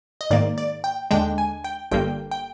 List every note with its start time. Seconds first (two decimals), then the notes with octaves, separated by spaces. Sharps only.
0.21 D#5
0.30 G#2 D#3 A#3 D5
0.58 D5
0.84 G5
1.11 D#2 D3 G#3 D4 G5
1.38 G#5
1.64 G5
1.91 G1 G2 D3 G3 A#3 G5
2.31 G5